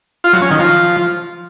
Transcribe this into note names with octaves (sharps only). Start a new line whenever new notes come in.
F4
F#3
C#4
D#3
F3